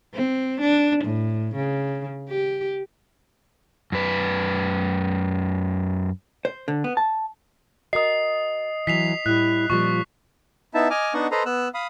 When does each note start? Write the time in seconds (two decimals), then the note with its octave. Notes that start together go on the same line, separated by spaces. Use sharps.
0.14 C4
0.61 D4
1.04 A2
1.55 C#3
2.29 G4
3.92 F#2 B4
6.45 C5
6.68 D3
6.84 B3
6.97 A5
7.93 F#4 A#4 D#5 D#6 C7
8.87 E3 F#3 B6 C7 F7
9.26 A2 G3 E4 F#6
9.70 A#2 F3 G3 F4 C#6
10.74 B3 D#4 E4 E5 A5
10.90 D#5 G#5 D6 F6
11.14 B3 D4 D#4 D#5 F#5 C#6
11.31 A4 B4 C5 D#5 A#5 C6
11.46 B3 E6 F#6
11.74 F5 B5 D#6